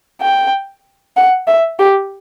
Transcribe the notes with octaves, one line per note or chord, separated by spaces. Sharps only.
G5
F#5
E5
G4